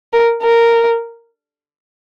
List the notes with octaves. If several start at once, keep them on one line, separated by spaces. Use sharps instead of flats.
A#4
A#4